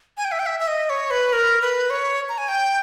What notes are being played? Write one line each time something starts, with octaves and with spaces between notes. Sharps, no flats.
G#5
G5
E5
G5
E5
E5
D#5
C#5
B4
A#4
B4
C#5
A#5
G#5
G5